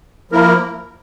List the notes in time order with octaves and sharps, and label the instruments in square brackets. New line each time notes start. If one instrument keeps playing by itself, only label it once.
[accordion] F3 A#3 E4 A#4